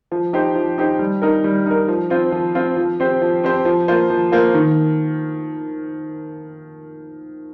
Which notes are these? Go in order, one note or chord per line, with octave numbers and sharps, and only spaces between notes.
F3
D#4 G4 C5
F3
D#4 G4 C5
G3
D#4 A#4
G3
D#4 A#4
F3
C4 F4 C5
F3
C4 F4 C5
F3
C4 G4 C5
F3
C4 G4 C5
F3
A#3 F4 C5
F3
A#3 F4 C5
D#3